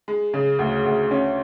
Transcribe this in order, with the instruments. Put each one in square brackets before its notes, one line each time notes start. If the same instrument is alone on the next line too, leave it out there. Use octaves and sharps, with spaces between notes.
[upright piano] G#3
C#3
D2
D2
C#4